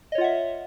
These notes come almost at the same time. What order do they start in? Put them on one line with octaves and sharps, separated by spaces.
D#5 C#5 F4 F#5 E5